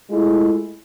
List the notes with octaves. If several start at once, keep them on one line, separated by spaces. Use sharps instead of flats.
G#3 A3 E4 F4 G#4